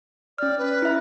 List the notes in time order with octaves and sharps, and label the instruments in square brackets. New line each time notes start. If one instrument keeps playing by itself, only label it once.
[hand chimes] C#4 F6 [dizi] D5
[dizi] B4
[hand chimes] E4 E5